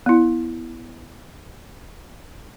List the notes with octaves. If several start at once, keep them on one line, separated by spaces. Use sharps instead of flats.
B3 E4